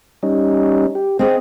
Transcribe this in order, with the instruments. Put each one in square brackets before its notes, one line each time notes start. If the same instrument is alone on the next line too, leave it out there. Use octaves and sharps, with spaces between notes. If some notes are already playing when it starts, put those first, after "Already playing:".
[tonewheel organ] G3 C#4 D#4
G4
[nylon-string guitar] C4 G#4 [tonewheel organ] D#5